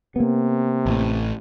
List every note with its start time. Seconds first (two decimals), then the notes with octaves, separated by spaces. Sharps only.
0.16 C3 A#3 B3
0.86 A1 A2